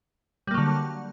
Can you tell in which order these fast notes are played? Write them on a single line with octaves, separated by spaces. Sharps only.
G3 A#3 F#3 D3